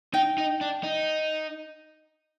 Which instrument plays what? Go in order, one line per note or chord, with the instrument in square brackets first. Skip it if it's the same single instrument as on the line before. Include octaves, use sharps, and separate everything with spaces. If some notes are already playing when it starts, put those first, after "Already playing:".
[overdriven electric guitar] D#4 [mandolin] G5
[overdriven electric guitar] D#4
D4
D#4